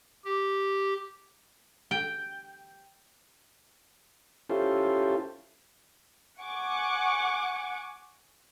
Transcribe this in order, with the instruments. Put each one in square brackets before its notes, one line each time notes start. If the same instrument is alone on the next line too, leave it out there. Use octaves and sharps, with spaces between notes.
[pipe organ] G4
[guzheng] G5
[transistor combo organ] C#4 E4 F4 G4 A4 C5
[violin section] F#5 G#5 C#6 D6